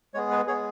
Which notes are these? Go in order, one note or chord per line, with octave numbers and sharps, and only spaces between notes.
G#3 B3 G#4 C#5
B4
G#3 B3 G#4 C#5